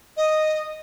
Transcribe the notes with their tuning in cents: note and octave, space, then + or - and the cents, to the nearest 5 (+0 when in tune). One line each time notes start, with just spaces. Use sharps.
D#5 -5